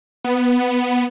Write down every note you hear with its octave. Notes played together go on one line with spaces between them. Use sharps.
B3